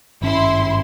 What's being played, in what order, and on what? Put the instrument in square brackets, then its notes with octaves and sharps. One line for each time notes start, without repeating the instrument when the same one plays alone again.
[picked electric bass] G#1 C#4 [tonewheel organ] G2 B5 [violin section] E4 C6